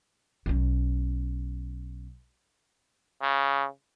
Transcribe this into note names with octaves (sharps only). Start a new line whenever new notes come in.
B1 C#4
C#3